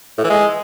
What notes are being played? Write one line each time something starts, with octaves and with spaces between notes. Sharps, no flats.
A2
E3
G#3